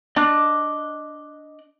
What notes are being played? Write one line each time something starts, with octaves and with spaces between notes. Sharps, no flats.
D4 D#5 D6 F#6